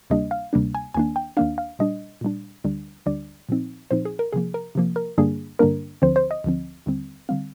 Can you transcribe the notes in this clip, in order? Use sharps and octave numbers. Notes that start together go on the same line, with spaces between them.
D2 C3 G3 A#3 D4 D#5
F5
D2 C3 G3 A#3 D4
G#5
D#2 D#3 A#3 D4 G#5
G5
D#2 D#3 A#3 D4 F5
F5
A#2 G3 D4 D#5
A#2 G3 D4
D2 D3 G3 D4
D2 D3 G3 D4 D5
A#2 F3 C4 D#4
A#2 F3 C4 D#4 C5
G#4
A#4
C3 F3 A#3 G#4
A#4
C3 F3 A#3
A#4
G2 D3 G3 A#3 D4 G#4
G2 D3 G3 A#3 D4 A#4
D2 D3 F3 C4 C5
C5
D#5
D2 D3 F3 C4
D#2 D3 G3 C4
D3 G3 C4 F5